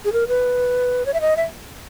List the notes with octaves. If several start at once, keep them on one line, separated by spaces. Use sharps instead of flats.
G#4
A#4
B4
C#5
E5
D#5
E5